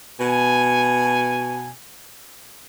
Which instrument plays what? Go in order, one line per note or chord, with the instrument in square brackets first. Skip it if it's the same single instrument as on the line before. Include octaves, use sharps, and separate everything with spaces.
[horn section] B2 G#5